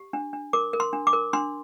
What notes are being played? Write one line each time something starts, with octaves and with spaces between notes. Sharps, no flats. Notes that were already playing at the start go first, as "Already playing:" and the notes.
Already playing: G4
D4
D4
A#4 D6
A#4
C6
D4
D6
A#4
D4 C6